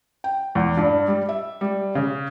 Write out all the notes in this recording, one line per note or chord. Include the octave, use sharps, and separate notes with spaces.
G5
E2
G2
G3
E5
G3
C#3